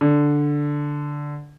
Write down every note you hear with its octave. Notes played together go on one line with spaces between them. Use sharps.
D3